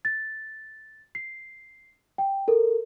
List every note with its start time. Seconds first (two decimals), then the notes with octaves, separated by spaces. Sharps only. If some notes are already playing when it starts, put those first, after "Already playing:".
0.05 A6
1.15 C7
2.18 G5
2.48 A4 A#4